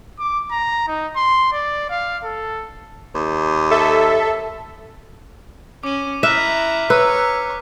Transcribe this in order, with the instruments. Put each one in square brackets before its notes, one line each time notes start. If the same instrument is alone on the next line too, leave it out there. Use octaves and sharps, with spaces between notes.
[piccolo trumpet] D6
A#5
D#4
C6
D5
F5
A4
[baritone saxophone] D#2
[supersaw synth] A4 E5
[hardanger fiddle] C#4 [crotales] D6 D#7
[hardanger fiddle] E4 A#5 [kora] E5 [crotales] F6 F#6 B6
[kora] B4 [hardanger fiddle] C#5 [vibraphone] A#5 E6